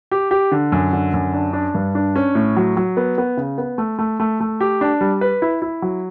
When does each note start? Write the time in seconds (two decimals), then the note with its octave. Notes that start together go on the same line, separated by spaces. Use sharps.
0.11 G4
0.31 G4
0.52 D3
0.72 F#2
0.93 D3
1.14 F#2
1.34 D4
1.53 D4
1.75 G2
1.95 D4
2.16 C#4
2.35 A2
2.56 F#3
2.77 F#3
2.97 B3
3.18 B3
3.37 C#3
3.58 B3
3.78 A3
3.99 A3
4.20 A3
4.40 A3
4.60 G4
4.81 D4
5.01 G3
5.21 B4
5.42 E4
5.62 E4
5.82 F#3